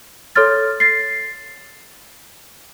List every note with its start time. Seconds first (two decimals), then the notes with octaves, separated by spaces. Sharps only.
0.35 A4 C#5 C6 F6 A6
0.80 A6 C7